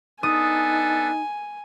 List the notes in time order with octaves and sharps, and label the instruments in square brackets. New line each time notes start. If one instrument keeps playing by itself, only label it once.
[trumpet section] B3 D4 A4 [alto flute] D#4 [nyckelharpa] G#5 [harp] D#6